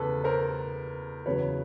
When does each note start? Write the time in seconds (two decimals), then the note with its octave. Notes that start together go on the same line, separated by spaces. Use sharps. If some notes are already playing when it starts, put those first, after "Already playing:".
Already playing: E2 C#3 A4 B4
0.24 A#4 C5
1.26 E2 C#3 F#3 B4 C#5